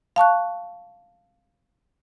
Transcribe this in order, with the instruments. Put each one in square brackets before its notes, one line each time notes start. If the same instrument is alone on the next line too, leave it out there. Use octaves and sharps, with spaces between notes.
[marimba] F5 A5 C#6 F#6